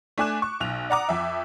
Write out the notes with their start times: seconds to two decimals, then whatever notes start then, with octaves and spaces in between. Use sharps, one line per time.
0.18 A3 D4 G#5 D6 F#6 E7
0.42 C#6
0.60 B1 F#6 F7
0.90 D5 F#5 A#5 D6 D#6
1.09 F2 E5